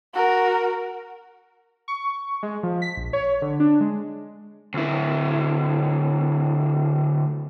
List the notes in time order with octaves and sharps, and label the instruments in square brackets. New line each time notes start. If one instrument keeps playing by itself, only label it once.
[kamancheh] F#4 A#4
[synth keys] C#6
G#3
F3
B6
A#1
C#5
D3
D4
G#3
[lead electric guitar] D2 E4